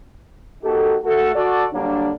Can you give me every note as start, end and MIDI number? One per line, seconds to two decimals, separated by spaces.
0.63 0.96 58
0.63 0.96 63
0.63 0.96 66
0.63 0.96 67
0.63 0.96 69
1.04 1.33 57
1.04 1.33 66
1.04 1.33 69
1.35 1.64 66
1.35 1.64 69
1.35 1.64 74
1.73 2.12 50
1.73 2.12 54
1.73 2.12 55
1.73 2.12 58
1.73 2.12 62